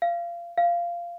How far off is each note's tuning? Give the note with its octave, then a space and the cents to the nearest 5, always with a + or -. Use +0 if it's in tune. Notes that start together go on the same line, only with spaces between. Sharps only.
F5 -25
F5 -15